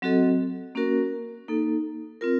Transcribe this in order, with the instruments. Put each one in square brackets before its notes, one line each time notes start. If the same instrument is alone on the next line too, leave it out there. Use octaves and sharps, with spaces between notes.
[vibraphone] F#3 C4 F#4 A4 D#5
A#3 C#4 F#4 A#4
A#3 D#4 A4
C4 F4 A#4